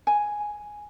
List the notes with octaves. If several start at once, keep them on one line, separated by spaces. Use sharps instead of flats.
G#5